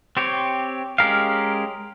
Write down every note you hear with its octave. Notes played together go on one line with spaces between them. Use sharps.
C4 G4 C#5
G#3 C#4 G4 A#4 F5